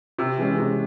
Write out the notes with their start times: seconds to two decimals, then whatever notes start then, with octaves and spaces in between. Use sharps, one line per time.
0.18 C3 E6
0.38 E3 G#3 C#4
0.58 C3